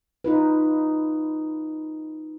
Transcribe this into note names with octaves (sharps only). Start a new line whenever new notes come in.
D#4 F4 B4